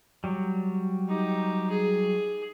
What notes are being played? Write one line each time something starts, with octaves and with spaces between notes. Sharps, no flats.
F#3 G3
D#4 G4
G#4